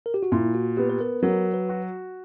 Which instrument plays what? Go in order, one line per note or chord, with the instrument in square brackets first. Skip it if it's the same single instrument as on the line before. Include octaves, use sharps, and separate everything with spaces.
[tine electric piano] A#4
G4
F#4
[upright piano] A#2 [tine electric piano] E4
[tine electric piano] F#4
[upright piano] B3 [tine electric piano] G4
[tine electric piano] B4
A#4
[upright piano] F#3 [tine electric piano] A#4
[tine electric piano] B4
[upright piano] F#4